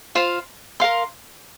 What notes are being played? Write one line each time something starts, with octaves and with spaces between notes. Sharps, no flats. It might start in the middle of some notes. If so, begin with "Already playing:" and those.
F4 C5 F5
A#4 F5 C6